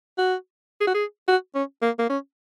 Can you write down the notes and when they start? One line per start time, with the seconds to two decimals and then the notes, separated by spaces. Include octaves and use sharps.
0.18 F#4
0.81 G#4
0.87 F#4
0.94 G#4
1.28 F#4
1.55 C#4
1.82 A#3
1.99 A#3
2.09 C#4